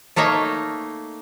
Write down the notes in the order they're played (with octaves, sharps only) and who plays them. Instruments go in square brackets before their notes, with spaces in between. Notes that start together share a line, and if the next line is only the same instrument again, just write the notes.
[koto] A3 A#3 D#4 C#5 D#5